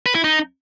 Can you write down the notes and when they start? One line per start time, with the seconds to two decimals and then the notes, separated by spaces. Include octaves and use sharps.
0.06 B4
0.15 E4
0.24 D#4